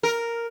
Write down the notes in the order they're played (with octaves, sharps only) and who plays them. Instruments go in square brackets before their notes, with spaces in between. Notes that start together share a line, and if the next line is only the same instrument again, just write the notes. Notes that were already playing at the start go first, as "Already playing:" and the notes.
[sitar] A#4